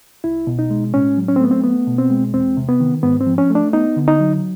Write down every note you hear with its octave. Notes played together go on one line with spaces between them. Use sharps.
C2 E4
B2
D#4
G#3
A2 C#4
F#3
C#4
C4
A3 B3
C4
B3
B2
C4
G#3
E2 C4
C3
B3
D#3
G#2 B3
C4
F3
C#4
A3
D4
B3 D#4
D3
D#4
F#3